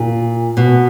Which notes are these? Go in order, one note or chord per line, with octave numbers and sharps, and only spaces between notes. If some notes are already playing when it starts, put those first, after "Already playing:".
Already playing: A#2
B2